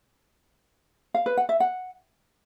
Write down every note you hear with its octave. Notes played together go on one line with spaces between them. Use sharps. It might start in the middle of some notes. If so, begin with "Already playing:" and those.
F5
B4
F#5
E5
F#5